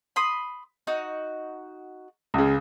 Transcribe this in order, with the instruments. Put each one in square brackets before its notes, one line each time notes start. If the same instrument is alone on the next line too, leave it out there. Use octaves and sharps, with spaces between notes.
[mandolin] B5 C6 D#6
D#4 F#4 F#5
[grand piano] C#2 C#3